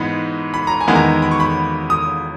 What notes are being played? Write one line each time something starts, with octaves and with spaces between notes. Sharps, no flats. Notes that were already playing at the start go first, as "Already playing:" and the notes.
Already playing: G#2 E3 G#3 B3 B5
B5
A#5
G#5
E2 D#3 G#3 B3 E4
A#5
B5
C#6
B5
D#6